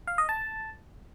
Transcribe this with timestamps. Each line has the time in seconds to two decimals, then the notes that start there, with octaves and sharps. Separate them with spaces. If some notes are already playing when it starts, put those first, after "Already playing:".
0.07 F5
0.18 D#5
0.29 A5